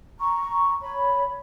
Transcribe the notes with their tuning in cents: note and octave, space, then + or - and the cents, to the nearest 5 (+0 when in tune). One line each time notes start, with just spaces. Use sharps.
A#5 +0 C#6 +0
C#5 +10 B5 +0